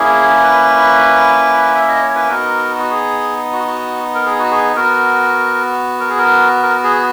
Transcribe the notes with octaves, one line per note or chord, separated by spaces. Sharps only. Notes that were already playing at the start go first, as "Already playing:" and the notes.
Already playing: A#3 C#4 E4 G#4
B4
E5
D#5
C#5
B4
B3 D#4 F#4 A#4
F#4
G#4
F#4
F#4
A#4
G#4
F#4
G#4
B3 F#4 A#4
A#4
G#4
A#4
A#4
G#4